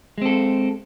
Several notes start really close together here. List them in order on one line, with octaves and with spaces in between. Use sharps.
G#3 C4 A4